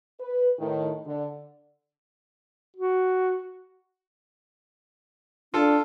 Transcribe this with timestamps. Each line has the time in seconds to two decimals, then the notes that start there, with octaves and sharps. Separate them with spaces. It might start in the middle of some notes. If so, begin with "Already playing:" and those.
0.20 B4
0.59 A2 D#3
1.06 D3
2.76 F#4
5.54 D4 F4 A4